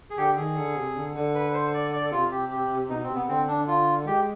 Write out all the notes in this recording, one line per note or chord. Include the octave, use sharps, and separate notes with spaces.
G#4
D3 G4
D#3 G#4
D3
C3
D3
D3
B4
C5
D5
D5
C3 F4
G4
G4
B2 D#4
C4
C3
B3
D3 C4
D4
F4
G#3 G4